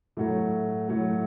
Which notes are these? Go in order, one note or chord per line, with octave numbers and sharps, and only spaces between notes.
A2 F#3 A3
A2 F#3 A3